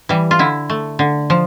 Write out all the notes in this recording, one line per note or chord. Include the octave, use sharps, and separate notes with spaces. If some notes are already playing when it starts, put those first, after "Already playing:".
E3 G3
F4
D3 E4
A3
D3
F3